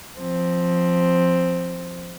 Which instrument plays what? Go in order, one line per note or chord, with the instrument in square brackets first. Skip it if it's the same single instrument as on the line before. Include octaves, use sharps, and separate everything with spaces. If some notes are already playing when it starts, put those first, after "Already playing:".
[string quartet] F3 C4